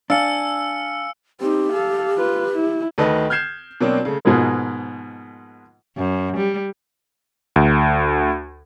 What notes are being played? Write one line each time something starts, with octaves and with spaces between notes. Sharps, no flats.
D4 F5 G#5 E6 C#7
C4 D#4 G4
A4 F5
F4 B4
E4
D2 D#3 A4 B4 D#5
F6 G6 G#6 C7 E7
B2 F#3 A#3 C4 D4
C#3 A3
G#2 B2 F3 G#3 A#3
F#2
G3
D2